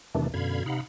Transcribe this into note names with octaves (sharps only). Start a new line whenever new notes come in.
E2 C3 D#3 E3 A3 D4
F#2 B2 D3 F5 B5 G#6
C3 D#4 F5 F#5 B5